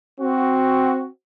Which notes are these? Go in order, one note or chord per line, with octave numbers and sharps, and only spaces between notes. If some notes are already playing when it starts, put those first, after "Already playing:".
C4 F#4